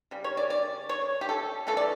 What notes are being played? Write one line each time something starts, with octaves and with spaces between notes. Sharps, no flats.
C#3 G3
C#5
D5
D5
C#5
G4
A4
C#3 E3 A3 A4
D5